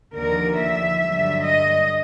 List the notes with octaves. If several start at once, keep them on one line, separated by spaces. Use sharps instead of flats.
D#2 D3 F3 A#4
E5
G2 D3 F#3
D#5